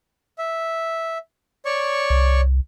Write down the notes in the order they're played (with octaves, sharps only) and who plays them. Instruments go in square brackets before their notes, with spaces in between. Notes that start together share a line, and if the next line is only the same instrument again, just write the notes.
[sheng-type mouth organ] E5
C#5 D5 C#6
[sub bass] C2